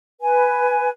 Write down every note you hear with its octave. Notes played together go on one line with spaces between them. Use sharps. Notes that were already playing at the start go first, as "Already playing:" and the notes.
B4 G#5